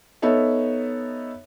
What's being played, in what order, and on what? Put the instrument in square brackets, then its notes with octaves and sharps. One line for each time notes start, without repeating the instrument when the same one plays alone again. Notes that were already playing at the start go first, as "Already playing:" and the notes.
[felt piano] B3 D#4 A4 C#5 E5